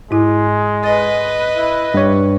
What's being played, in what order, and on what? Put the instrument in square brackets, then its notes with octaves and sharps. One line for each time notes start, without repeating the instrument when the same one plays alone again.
[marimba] G#2 E4 [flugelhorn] G#3
[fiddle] B4 D#5 [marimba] A6
[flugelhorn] E4
[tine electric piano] G2 C#5 [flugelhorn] G3